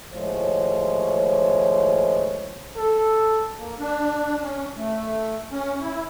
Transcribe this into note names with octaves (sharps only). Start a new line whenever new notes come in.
D#2 A2 F3 G#3 C5 C#5
A4
A#3
D4
C#4
A3
C#4
E4